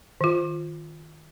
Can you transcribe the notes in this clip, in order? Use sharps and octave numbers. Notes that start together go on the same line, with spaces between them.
D#3 F4